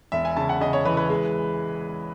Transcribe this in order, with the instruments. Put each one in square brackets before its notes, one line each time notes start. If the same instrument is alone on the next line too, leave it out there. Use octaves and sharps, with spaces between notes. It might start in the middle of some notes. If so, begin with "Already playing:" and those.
[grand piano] E1 E5
G#5
C#3 A5
F#5
C#3 D#5
C#5
E3 B4
B4
G#3